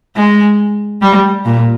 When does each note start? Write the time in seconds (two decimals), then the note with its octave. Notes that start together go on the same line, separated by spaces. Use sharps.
0.16 G#3
1.02 G3
1.45 A#2